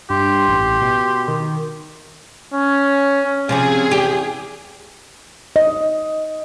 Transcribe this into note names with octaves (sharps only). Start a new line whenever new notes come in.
G2 G4 C6
A1
B2
D#3
C#4
C3 F3 C#4 G#4
E2 G4
D#5